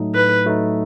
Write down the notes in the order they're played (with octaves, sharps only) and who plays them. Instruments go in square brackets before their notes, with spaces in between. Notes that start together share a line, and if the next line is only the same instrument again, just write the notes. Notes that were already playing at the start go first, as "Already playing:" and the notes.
Already playing: [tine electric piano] A2 F#3 A3 D#4
[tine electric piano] A2 [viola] B4
[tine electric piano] F#3 A3 D#4